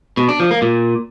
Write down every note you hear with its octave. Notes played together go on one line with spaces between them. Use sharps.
B2
D4
F3
A#3
A#2